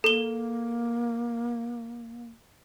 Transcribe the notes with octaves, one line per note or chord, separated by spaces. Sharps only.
A#3 A4 G7